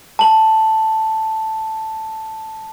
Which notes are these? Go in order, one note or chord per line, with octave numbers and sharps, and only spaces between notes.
A5 F#7